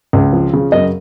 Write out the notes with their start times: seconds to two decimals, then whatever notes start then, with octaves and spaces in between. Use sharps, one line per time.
0.13 C#2
0.33 F3
0.53 C#3
0.72 F#2 D#5